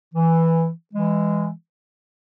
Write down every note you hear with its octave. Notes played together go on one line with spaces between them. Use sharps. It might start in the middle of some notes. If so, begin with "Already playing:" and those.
E3
E3 G#3